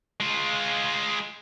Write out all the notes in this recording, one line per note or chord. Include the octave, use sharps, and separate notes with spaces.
G#3 F4